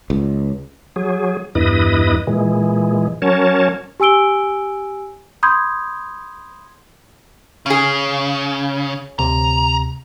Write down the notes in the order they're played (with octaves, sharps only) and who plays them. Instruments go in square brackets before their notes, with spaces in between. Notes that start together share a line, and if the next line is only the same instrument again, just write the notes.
[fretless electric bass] C#2
[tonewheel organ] F#3 G#4
E2 G2 E4 B4 D#5 D#6
A#2 E3 G#3
F#3 C#4 A#4 C#5 A5
[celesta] G4 G#5 E6 D7 G7
B5 C6 D#6 G6 G#6
[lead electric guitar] C#3 [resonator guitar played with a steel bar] C#4 G#4
[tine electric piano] D2 C3 [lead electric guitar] A#5